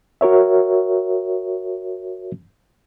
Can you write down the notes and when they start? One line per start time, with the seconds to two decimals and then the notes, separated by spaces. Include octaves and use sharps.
0.21 F#4 A#4 C#5 E5